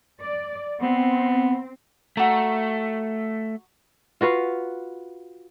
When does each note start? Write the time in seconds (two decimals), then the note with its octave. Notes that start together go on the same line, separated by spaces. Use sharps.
0.22 D5
0.82 B3 C4
2.17 A3 F#4 A#5
4.21 F4 F#4 B4 F5